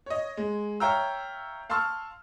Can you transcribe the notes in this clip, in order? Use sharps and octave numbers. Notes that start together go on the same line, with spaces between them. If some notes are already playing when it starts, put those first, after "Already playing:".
C#5 D#5
G#3
C#5 E5 F5 G5 A#5 E6
F5 A5 C6 C#6 E6 F6